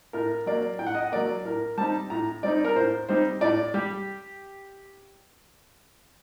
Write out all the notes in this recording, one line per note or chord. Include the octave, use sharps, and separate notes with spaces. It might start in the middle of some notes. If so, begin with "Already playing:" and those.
A2 A#4
F#3 A#3 D5
A2 G5
F#5
D#5
F#5
F#3 A#3 D5
A2 A#4
G3 C4 D#4 A5
A2 A#5
G3 C4 D#4 D5
A#4
A2 C5
G3 C4 D#4 C5
A2 D5
G3 G4